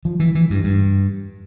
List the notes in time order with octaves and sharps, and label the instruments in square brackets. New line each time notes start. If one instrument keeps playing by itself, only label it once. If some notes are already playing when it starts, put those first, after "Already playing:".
[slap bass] F3
E3
E3
G2
G2